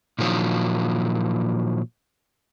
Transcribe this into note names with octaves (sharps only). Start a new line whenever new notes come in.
A#2 D#3 F3 F#3